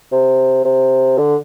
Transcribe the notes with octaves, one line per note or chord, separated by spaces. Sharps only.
C3
C3
D3